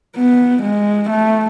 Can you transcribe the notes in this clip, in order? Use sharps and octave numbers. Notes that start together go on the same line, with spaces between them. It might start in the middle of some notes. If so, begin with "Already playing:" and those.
B3
G#3
A3